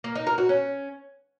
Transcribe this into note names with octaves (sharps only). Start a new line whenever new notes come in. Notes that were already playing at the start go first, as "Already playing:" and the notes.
A#3
D#4
A#4
F#4
C#4